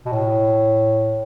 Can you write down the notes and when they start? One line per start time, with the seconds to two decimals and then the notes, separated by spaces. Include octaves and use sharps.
0.06 B2
0.13 A2